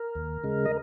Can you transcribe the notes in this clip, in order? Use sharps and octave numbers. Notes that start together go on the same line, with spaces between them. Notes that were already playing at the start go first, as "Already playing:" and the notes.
Already playing: A#4
D#2
C#3 G#3
D#5